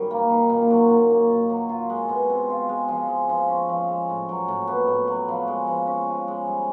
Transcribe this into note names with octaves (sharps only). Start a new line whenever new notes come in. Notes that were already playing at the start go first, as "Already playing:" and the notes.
Already playing: F#2 D#3 G3
A#3
D#3
A#2
F#3
A#2
A#3
A#2
F#3
F4
G#3
B2
C4
F4
G#3
F3
G#3
F3
C#4
F3
G#3
A2
F#3
A2
B3
A2
F#3
F3
G#3
F3
C#4
F3
G#3
G3